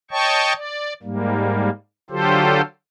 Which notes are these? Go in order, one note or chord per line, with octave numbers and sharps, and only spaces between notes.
C#5 D#5 G5 A5 C#6
D5
G#2 G3 A#3
D3 F#3 F4 G4 A4 C5